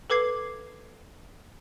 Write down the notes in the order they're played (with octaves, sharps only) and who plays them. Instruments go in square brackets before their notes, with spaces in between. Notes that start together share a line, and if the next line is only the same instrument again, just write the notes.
[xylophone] A4 B4 D6 G#6 C7